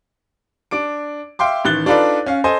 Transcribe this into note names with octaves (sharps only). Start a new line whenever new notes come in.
D4 D6 D7
E5 F5 G5 C6 D6
A1 D#3 F#6 A6 G7
D4 D#4 F4 A4 B4 D5
C#4 F5
A4 C5 D#5 G#5